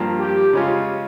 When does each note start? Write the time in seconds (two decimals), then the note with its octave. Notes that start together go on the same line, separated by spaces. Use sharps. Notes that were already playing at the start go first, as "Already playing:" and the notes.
Already playing: G2 F3 A#3
0.19 G4
0.53 C#3 G#3 C#4 F4